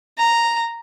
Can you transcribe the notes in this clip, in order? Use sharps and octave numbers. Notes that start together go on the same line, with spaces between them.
A#5